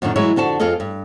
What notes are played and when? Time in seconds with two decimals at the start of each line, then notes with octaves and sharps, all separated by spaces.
0.02 F#2 A#2 D3 D#3 D4
0.16 E3 F#3 G#3 E4 C#5
0.36 F2 D3 F#4 A5
0.60 F2 F4 G#4 A4 D#5
0.80 G2